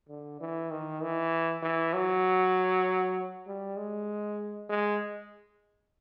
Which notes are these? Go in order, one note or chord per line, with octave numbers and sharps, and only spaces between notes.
D3
E3
D#3
E3
E3
F#3
G3
G#3
G#3